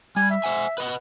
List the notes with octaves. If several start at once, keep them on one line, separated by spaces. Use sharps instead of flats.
G3 G#5
E5
C5 F#5 G#5
B4 D#5 F#5